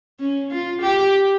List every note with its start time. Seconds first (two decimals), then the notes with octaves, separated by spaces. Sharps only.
0.20 C#4
0.51 F4
0.82 G4